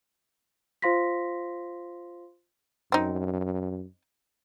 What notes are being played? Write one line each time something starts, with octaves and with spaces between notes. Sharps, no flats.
F4 C5 F5 C6 A#6 B6
F#2 C4 D#4